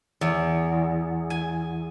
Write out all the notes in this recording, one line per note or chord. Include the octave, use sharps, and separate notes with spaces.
E2
G#5